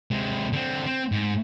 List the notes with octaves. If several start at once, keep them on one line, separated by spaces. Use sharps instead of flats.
C3 G#3
D3 C4
C4
G#2